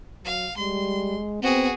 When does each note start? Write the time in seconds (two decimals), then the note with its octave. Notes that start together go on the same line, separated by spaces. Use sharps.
0.25 F#3 F5
0.58 G3 G#3 C6
1.43 B3 C4 F#4 G#4